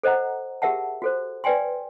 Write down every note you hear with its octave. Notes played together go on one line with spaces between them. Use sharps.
A4 C5 D#5 F#5 A#5
G4 G#4 A#4 E5 F#5 A5
F#4 A4 C5
B4 D5 G5 G#5 C6